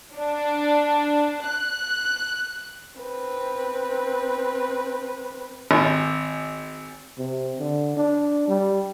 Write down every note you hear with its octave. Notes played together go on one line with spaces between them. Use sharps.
D4
F#6
C4 B4
G#1
C3
D3
D4
G3